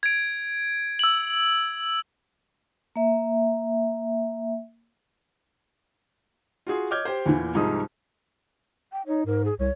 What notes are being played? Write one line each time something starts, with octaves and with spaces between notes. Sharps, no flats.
G#6 D7
E6 F#7
A#3 E5
F4 F#4 G#4 C6
C#5 D#5 D6 F6 G6 G#6
G4 C5
E2 A#2 E3
C2 G#2 F3 D#4 G#4 D#6
G5
D#4 C#5
G#2 A#4
G#4
C2 C#5